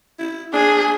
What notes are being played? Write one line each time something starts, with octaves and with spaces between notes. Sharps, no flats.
E4
D4 G#4